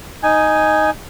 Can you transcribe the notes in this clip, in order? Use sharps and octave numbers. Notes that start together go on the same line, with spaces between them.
D#4 G#5